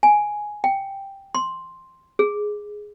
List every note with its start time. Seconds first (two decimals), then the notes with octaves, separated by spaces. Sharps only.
0.03 G#5
0.64 G5
1.35 C6
2.19 G#4